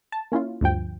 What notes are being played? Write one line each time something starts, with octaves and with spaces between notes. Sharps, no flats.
A5
A#3 C#4 E4 F4
D2 G2 F3 G5